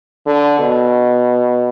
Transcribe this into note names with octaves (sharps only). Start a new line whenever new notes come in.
D3
B2